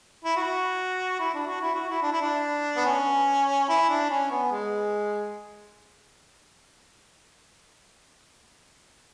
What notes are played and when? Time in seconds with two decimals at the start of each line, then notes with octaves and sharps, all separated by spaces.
0.24 E4
0.37 F#4
1.20 E4
1.34 D4
1.48 F#4
1.61 E4
1.75 F#4
1.89 E4
2.03 D4
2.12 E4
2.22 D4
2.76 B3
2.86 C#4
3.69 E4
3.89 D4
4.10 C#4
4.31 B3
4.51 G#3